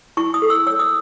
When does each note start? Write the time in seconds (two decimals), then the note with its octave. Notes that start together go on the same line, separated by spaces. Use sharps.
0.17 E4 C#6
0.34 D#6
0.42 A4
0.50 E6
0.67 C#5 E6
0.79 D#6